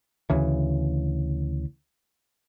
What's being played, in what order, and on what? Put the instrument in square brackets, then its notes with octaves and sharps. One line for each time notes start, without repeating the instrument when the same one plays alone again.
[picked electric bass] D2 C#3 E3